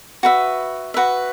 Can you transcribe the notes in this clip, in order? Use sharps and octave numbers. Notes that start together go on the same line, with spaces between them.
F#4 B4 E5
F#4 B4 E5